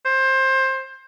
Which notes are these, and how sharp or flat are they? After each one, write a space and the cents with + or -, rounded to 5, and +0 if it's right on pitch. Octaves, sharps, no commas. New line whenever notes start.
C5 +20